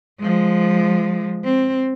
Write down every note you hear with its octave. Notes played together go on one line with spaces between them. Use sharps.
F3 G#3
C4